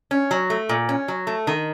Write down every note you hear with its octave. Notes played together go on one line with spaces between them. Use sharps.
C#4
F#3
A3
A#2
C#4
F#3
A3
D#3